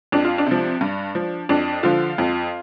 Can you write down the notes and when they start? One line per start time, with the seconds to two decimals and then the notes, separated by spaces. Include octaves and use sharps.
0.12 F2 D4
0.25 F4
0.38 D4
0.46 C3 F3
0.81 G2
1.15 F3
1.49 F2 D4
1.83 D3 F3 F4
2.18 F2